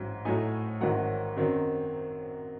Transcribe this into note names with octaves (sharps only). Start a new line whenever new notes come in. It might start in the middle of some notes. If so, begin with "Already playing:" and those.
Already playing: A1 G#2 F#3
A2 F#3 A3 D#4 G#5
A1 G#2 D#3 F#3 F#5
F#2 D#3 F#3 C4